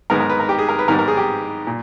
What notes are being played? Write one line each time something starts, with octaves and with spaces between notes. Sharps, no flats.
G#2 D#3 G#3 B3 A#4
A#4
B4
A#4
G4
G#4
A#4
B4
G#2 D#3 G3 B3 A#4
A#4
G#4
G4
A#2